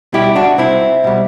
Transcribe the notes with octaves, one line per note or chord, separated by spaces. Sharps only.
B2 G3 E4 G4
D4 F#4
C2 C4 E4
B2 G3